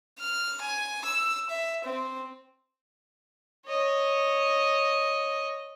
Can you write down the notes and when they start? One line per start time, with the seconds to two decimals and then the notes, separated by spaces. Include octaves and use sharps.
0.19 F6
0.61 G#5
1.04 E6
1.50 E5
1.85 C4
3.66 C#5 D#5